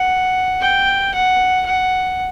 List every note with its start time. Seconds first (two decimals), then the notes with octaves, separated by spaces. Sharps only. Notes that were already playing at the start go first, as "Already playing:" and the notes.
Already playing: F#5
0.61 G5
1.14 F#5
1.66 F#5